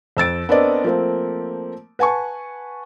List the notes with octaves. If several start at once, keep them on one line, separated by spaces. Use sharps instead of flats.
F2 E6 A6 D7
B3 C4 D4 A#4 D5 D#5
F3 A3 A#3 C4
B4 F#5 G#5 A5 C#6